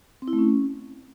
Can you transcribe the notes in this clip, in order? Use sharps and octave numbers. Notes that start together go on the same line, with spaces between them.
C4
E4
A3
C#4